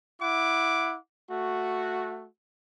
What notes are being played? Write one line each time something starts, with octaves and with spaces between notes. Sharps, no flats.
E4 F#5 D6
A3 F#4